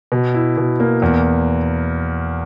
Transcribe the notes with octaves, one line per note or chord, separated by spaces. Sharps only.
B2
E4
B2
A#3
E2